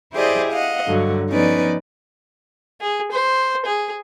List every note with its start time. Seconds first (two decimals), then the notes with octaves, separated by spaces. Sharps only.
0.15 E4 G4 G#4 C5 D5 D#5
0.53 D#5 F5 F#5
0.87 G2 D3 F#3
1.30 F3 B3 C#4 D#4 B4 D5
2.81 G#4
3.11 C5
3.66 G#4